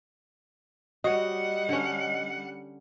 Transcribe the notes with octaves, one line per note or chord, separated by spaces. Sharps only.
G3 F#4 C#5 D#5 F#5
D3 C#4